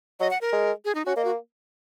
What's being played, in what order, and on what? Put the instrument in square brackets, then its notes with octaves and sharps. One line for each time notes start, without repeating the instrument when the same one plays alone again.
[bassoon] F#3 [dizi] D#5
[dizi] F#5
A#4
[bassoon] G#3
[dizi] G#4
D#4
[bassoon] C#4 [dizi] F#4
[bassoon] A#3 [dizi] D#5
[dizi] F#4